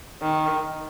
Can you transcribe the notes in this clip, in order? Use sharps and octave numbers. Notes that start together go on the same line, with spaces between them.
D#3